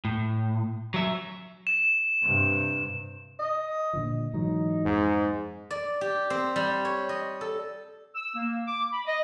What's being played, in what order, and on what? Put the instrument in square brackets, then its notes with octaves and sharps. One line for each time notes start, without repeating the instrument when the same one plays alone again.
[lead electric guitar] A2
F#3 E5
[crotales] E7
[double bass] G2 C3
[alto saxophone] D#5
[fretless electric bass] A#2 D3 F3
[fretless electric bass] G#2 E3 F#3 [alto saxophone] D#4
[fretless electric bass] F2 [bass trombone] G#2
[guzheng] D5
G4
C4
G3
C#5
D#5
A4
[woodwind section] E6
A#3
D6
B5
D#5